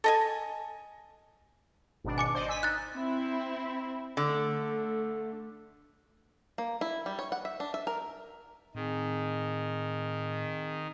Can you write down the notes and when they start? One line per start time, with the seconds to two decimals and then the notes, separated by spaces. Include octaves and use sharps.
0.04 A4 D#5 G#5
2.04 G#1 B2 D4
2.18 G#5 D6 C#7
2.34 C5 D5 D#5
2.49 G#5 E6 B6
2.63 D#4 F#6 A6
2.94 C4 E4
4.17 D3 A3
6.58 A#3
6.81 E4
7.06 G3
7.19 C#5
7.32 F#5
7.45 E5
7.60 D4
7.74 E5
7.87 A#4
8.75 A2 D#3 C4 G#4 G#5